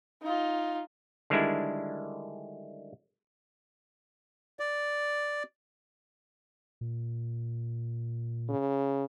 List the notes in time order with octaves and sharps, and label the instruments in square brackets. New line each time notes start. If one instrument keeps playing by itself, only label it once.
[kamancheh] D#4 F4
[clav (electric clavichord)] D3 D#3 G3 G#3 D4 E4
[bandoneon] D5
[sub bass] A#2
[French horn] C#3